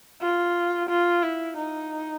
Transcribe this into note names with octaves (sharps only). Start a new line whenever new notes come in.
F4
F4
E4
D#4